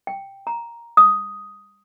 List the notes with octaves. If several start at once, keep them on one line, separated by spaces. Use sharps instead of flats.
G5
A#5
D#6